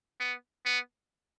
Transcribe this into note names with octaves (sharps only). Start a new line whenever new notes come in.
B3
B3